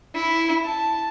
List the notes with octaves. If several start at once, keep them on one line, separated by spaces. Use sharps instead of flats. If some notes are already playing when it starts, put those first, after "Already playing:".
E4
A5